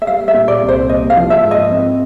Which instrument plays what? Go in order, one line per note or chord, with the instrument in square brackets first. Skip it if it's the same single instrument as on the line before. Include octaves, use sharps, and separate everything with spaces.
[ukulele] E5
[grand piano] G3 [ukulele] F5
[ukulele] E5
[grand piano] A#2
[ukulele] D5
[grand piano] C2
[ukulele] C5
[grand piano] A#3 [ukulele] D#5
[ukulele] F5
[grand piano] F3
[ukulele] E5
[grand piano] G#2
[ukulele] D#5
[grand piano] C4